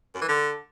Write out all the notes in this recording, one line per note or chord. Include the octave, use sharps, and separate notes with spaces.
F#2
E3
D3